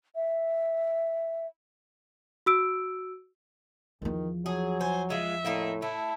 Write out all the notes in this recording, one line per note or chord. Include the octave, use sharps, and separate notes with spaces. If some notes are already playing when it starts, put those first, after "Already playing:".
E5
F#4 E6 D7
E2 D#3 F3
F#3 G#4
C5 G#5
G#3 F4 E5
A2 A#3 C4 D#4
A3 E4